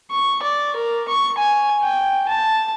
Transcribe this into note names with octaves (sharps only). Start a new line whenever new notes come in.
C#6
D5
A#4
C#6
G#5
G5
A5